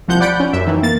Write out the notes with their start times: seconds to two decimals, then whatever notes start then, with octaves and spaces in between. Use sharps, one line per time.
0.08 C2 F3 F#5 G6
0.20 D5 F#5 B5 G6 D7
0.40 C#4
0.53 F#2 E5
0.66 D#3 E3
0.83 A#3 A6